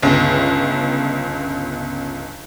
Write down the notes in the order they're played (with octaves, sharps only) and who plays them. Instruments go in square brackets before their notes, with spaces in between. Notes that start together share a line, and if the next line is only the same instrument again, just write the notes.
[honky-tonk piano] G1 C#2